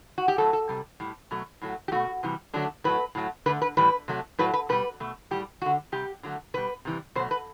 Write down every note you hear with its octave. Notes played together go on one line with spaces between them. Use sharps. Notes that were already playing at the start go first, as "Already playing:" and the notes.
F#4
G4
A2 F#3 A3 A4
A4
C3 G3
A2 G3
B2 F#3 A3
A2 F#3 A3
G4
B2 A3 F#4
C3 E3 G3
D3 F#3 A3 D4
A2 F#3 A3 B4
A2 F#3 A3
D3 A3 B4
B4
A2 E3 G3 B4
C3 F#3 A3
A2 F#3 A3 B4
B4
B2 G3 B4
B2 A3
A2 G3 G4
D3 A3 F#4
C3 G3 G4
D3 F#3 A3
B2 G3 B4
C3 E3 G3
B2 F#3 A3 C5
B4